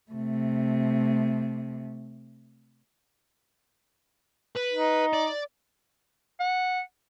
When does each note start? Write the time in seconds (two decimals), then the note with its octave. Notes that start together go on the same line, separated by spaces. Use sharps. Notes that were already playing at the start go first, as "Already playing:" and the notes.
0.12 C3 A3
4.55 B4
4.73 D#4
5.14 D5
6.40 F#5